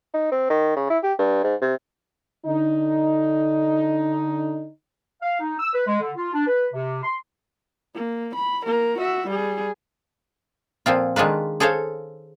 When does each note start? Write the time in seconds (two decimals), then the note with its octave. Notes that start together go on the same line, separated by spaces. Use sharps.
0.14 D#4
0.32 C4
0.50 D#3
0.76 C#3
0.90 E4
1.03 G4
1.19 G2
1.44 G#2
1.61 C3
2.45 D3 D#4
5.22 F5
5.40 D#4
5.59 E6
5.74 B4
5.87 G#3
6.00 D3
6.16 F4
6.33 D4
6.47 B4
6.73 C3
7.03 C6
7.95 A#3
8.35 B5
8.65 A#3 A#4
8.98 F#4 E5
9.27 G3 G#4
10.86 A#2 F3 C4 F4
11.16 D#3 G#3 D4 F4 B4
11.60 G#4 A4 C5 C#5 F5